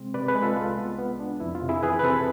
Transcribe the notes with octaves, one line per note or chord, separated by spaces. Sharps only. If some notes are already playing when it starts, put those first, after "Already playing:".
Already playing: C3 G#3 C4 C5
C3 B4 D5
G#4 B4
G#3
F4 A4
C2 F4
B3
B3
D4
F2 E4
F4
C3
E4 G#4
E3 G#4 B4
B4
C3 A4 C5